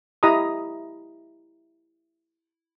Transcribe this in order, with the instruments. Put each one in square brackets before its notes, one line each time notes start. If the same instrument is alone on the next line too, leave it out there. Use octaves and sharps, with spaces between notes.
[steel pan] E4 G4 D#5 A#5 B5 D#6